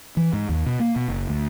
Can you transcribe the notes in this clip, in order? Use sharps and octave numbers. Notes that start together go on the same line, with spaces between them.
E3
G#2
D#2
B2
A#3
B2
F#1
D2